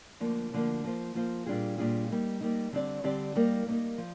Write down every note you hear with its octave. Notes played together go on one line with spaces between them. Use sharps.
D2 D3 F3 A#3
D2 D3 F3 A#3
F3 A#3 F4 C5
F3 A#3 F4 C5
A#2 G3 D4 F4 G#4
A#2 G3 D4 F4 G#4
G3 A#3 D#4
G3 A#3 D#4
D3 G3 C4 G4 D5
D3 G3 C4 G4 D5
G3 A#3 D#4 A#4
G3 A#3 D#4 A#4
F3